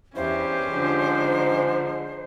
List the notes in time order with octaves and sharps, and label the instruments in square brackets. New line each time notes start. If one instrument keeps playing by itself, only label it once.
[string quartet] E2 [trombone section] G2 E4 [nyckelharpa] C#4 G4 [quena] C5
[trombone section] G#2 [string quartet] D3 F3